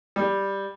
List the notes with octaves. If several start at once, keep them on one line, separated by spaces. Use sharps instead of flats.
G3